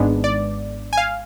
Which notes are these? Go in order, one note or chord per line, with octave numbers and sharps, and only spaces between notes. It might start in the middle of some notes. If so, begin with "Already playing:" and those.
Already playing: G#1 G#2 G#3 B3 D4
D5
G#5
F5